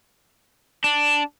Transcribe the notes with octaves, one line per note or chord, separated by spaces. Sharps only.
D4